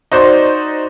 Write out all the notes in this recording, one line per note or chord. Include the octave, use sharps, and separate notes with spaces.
D#4 F#4 C5 D5